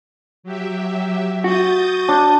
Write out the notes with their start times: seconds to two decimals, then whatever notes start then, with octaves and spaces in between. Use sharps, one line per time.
0.43 F#3 G4 E5
1.44 F#4 D#6 G6 A6
2.08 D4